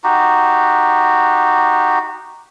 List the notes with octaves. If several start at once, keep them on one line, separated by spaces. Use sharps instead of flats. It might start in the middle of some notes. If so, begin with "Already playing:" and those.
D#4 F#4 G4